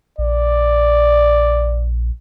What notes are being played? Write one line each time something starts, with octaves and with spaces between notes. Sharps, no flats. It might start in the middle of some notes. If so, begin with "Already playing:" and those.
A#1 D5